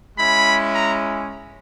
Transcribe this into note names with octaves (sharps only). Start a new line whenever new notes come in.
G#3 C#4 E4 B5
A#5